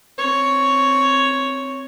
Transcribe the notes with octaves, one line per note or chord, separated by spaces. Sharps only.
C4 C#5